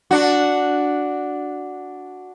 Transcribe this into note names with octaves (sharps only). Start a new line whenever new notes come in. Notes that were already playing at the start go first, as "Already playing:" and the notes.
D4 F#4